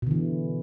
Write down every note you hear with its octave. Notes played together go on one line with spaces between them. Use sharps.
B2 D3 E3